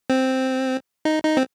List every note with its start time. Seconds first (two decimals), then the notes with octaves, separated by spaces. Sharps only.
0.10 C4
1.05 D#4
1.24 D#4
1.37 C4